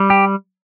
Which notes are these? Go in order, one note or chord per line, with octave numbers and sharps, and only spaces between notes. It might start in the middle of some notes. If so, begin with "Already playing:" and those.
Already playing: G3
G4